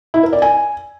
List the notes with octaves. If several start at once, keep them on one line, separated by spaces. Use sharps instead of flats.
E4
A#4
D5
G#5